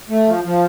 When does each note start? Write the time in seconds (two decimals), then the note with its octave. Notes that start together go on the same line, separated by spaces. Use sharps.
0.09 A3
0.27 F3
0.44 F3